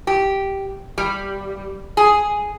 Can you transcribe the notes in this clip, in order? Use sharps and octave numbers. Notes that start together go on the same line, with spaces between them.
G4
G3
G#4